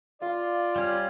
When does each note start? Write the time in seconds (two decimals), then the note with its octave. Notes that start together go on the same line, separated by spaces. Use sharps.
0.22 F4 D5 F5 C6
0.76 G3 C#4